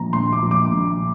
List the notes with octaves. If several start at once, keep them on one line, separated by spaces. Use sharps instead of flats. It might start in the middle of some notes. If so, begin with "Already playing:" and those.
Already playing: A#2 F3 A#5
A#1 C6
D6
A#2 F3
D6
A#1